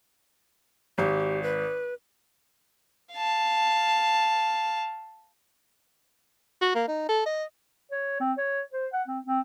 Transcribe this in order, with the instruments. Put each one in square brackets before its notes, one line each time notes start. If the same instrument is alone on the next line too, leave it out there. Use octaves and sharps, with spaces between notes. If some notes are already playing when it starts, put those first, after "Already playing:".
[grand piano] G#1 [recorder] G4
[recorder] B4
[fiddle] F5 A5
[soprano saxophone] F#4
A#3
D#4
A4
D#5
[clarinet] C#5
C4
C#5
C5
F#5
C4
C4